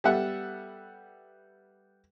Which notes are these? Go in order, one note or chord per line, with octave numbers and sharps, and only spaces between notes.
G3 B3 A4 E5 F#5